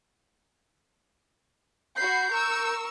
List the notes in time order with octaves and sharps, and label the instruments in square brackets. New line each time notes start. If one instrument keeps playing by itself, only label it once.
[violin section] F#4 B5 C7 [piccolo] G6
[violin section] A#4 C#6 E6